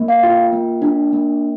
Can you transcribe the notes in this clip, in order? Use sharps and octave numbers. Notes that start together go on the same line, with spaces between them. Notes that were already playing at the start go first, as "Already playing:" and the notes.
Already playing: A#3
F5
F4 G5
A#3
D4
A#3